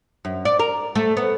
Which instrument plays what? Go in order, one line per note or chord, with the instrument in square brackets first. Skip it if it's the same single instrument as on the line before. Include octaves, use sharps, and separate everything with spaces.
[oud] F#2
D5
A#4
A3
B3